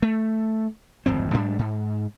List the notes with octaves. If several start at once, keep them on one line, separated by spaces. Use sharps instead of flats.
A3
D1 G#1 F2 C4
G#2 G3 D4
G#2